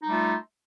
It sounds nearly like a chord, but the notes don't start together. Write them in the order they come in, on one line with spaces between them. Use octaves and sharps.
D#4 G3 A3 F4